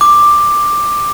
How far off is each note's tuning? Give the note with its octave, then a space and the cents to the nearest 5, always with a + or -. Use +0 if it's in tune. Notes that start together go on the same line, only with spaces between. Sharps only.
D6 +10